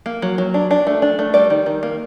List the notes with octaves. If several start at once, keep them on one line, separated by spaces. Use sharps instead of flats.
A#3
F#3
F#3
D4
D4
A3
D4
A3
G3 D5
D#3
D#3
A#3